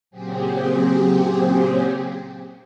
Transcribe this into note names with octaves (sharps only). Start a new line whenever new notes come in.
A#2 C#3 F#3 C4 G4 G#4